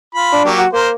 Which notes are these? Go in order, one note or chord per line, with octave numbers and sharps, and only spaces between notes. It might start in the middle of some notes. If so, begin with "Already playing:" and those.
F4 B5
D4
F#3 A#3 G4
F#4
A#3 A#4 C5